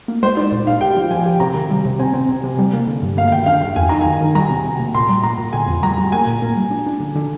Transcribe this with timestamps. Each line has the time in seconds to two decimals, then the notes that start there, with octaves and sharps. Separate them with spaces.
0.08 A#3
0.23 G#3 C5
0.37 D#4 D5
0.52 A#2
0.67 D#4 F5
0.81 G4 G5
0.96 F3
1.11 F3 G#5
1.26 G4
1.40 C3 A#5
1.55 D#3
1.70 G3
1.85 C3
1.99 C4 G#5
2.14 C4
2.29 C3
2.44 C3
2.58 G3
2.73 A#3
2.87 D3
3.02 G2
3.17 A#3 F5
3.28 F5
3.32 D#3 G5
3.46 D4 F5
3.62 G2 F5
3.76 F2 G#5
3.89 D#4 A#5
4.01 G#5
4.06 D#3
4.21 D#3
4.35 G3 A#5
4.50 C3
4.65 C3
4.80 A#3
4.94 A#2 C6
5.09 G3
5.23 A#2 A#5
5.38 A#2
5.53 D3 G#5
5.67 F2
5.83 G3 A#5
5.98 G3
6.12 A#3 G#5
6.27 A#2
6.42 A#3
6.57 G3
6.71 D4
6.87 D4
7.00 D3
7.16 D3